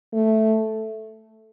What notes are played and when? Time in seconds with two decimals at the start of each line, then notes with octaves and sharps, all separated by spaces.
0.13 A3